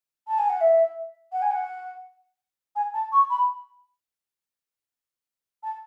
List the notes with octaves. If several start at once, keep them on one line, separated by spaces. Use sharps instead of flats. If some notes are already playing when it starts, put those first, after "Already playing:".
A5
G#5
F#5
E5
F#5
G#5
F#5
G#5
A5
C#6
B5
A5